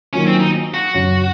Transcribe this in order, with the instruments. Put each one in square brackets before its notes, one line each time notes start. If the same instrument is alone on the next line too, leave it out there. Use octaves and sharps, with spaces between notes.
[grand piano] D#3 F#3 A#3 F4 [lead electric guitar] C#4
[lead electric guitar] C4
D#4
F#4
[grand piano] F#2 C#3 F#3